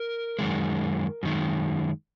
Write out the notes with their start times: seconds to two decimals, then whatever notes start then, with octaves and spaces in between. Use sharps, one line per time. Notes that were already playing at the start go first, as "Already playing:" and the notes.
Already playing: A#4
0.39 F#2 D#3 G#3
1.23 F#2 D#3 G#3